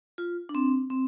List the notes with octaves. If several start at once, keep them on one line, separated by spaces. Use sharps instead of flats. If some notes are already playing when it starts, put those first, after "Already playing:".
F4
D4
C4
C4